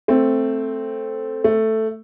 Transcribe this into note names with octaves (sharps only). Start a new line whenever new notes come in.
A3 C4
A3